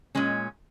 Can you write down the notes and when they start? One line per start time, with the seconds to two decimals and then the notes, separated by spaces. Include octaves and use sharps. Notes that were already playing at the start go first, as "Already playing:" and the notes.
0.15 A#2 G#3 C#4